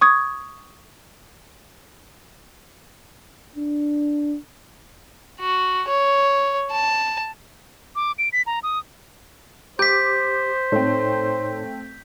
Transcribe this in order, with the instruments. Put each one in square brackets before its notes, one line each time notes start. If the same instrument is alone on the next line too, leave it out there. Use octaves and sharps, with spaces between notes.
[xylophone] C#6 D#6 G#6
[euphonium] D4
[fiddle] F#4
C#5
A5
[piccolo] D6
D7
B6
A#5
D#6
[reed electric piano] G4 [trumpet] C5 [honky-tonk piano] D6 [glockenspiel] G6 B6
[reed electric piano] A2 D#4 C#5 [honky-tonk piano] A3 C4